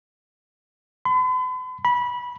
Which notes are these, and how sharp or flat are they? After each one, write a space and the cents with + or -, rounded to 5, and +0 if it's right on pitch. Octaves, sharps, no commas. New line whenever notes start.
B5 +45
B5 -20